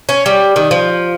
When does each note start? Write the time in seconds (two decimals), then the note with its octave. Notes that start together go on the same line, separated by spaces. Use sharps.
0.09 C#4
0.26 G3
0.56 D#3
0.71 F3